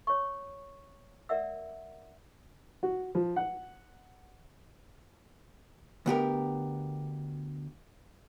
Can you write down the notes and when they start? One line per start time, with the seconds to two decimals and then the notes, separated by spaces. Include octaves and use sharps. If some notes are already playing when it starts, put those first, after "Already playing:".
0.07 C#5 C#6
1.29 A#4 D5 E5 F#5 E6
2.83 F#4
3.15 F3
3.36 F#5
6.06 D2 B3 G4 A#4